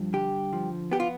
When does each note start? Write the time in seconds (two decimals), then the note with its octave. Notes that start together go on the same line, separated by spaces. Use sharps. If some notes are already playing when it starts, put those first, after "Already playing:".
Already playing: G2 F3
0.13 D3 G4
0.53 F3
0.92 B3 G4
1.00 F4